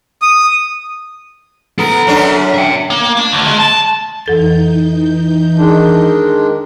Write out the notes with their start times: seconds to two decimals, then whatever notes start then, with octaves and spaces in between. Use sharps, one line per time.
0.22 D#6
1.79 B3 A4 A#5
2.07 F#2 C#4 D4
2.54 E5 G5
2.90 A#3
3.17 D4
3.32 D2
3.47 G#3
3.58 A5
4.26 F2 E3 D#4 A4 G6 A6
5.58 D#3 G#3 D4